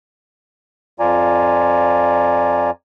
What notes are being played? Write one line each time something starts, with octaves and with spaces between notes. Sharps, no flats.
F2 F3 F4 D5 G#5 A#5